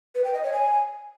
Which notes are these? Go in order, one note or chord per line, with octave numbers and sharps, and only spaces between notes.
B4
G5
D#5
C#5
G#5